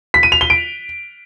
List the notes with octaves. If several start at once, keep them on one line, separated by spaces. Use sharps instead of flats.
B6
D#7
F7
G7
D7